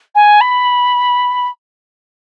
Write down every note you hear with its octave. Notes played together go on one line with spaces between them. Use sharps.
G#5
B5